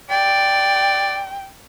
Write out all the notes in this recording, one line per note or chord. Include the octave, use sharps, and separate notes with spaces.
D5 G5